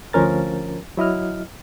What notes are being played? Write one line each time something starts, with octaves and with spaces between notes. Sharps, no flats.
D2 F3 C#4 A#4 A6
F#3 E4 D#5 F6